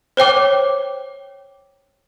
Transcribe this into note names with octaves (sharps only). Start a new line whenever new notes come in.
C5 C#5 G5 D6